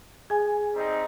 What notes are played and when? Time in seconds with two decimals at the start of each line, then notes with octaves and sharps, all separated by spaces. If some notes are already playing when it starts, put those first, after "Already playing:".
0.30 G#4 G#5
0.72 G3 C4 D#4 G4